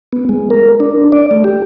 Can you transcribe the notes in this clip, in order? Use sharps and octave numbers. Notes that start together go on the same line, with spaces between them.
B3
G#3
A#4
D4
D5
A3
G4